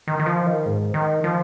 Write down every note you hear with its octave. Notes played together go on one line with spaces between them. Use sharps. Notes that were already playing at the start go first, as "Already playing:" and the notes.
D#3
D#3
F3
D#3
G#2
D#3
F3